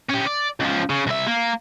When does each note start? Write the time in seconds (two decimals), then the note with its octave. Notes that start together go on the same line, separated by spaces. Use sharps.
0.10 C#4 G4
0.27 D5
0.60 C#2 F3
0.90 C#3
1.07 C2 E5
1.27 A#3